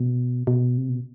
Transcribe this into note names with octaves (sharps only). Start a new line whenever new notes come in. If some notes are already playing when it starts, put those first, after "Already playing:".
Already playing: B2
B2
C3
B2